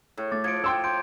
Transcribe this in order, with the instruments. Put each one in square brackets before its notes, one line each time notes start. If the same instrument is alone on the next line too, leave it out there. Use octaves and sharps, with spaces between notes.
[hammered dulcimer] A2
[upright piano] A3 [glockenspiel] D6 A6
[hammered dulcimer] F3 [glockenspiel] G#6 C#7 D7
[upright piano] G5 C6 E6
[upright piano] G5 [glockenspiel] C6 G6 D7